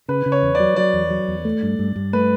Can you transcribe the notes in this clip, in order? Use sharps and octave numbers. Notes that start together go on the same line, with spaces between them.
C#3 B4
C#3
C#5
E2
D5
F#3
F#3 D5
E2
F#3
E2
A3
G2
G2
G2
A3 B4